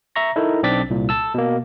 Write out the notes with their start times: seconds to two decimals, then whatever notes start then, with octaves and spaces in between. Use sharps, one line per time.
0.16 E5 A#5 C#6 A#6
0.36 D#4 E4 A4 A#4
0.63 B1 C4 D4 D6 A6 B6
0.90 C2 A#2
1.09 A5 E6
1.34 B2 A#3